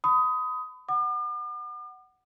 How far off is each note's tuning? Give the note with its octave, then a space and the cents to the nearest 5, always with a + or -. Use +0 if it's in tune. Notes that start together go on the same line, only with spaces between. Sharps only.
B5 +35 D#6 +15
F#5 +10 D6 +45